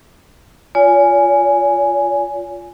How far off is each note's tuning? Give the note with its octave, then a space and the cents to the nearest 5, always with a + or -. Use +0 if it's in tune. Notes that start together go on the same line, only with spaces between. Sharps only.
F4 +0 C#5 +45 G#5 +0